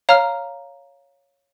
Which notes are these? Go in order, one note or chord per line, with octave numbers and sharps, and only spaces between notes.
C#5 F5 A#5 F6